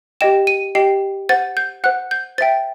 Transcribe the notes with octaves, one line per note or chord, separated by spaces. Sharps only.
G4 D#5 G5 E7
D#7
G4 D#5 G5 C7
C5 F#5 A6
G6
C5 F#5 F#6
G6
C5 E5 G5 A6